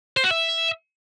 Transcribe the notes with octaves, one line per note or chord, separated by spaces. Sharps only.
C5
F#4
E5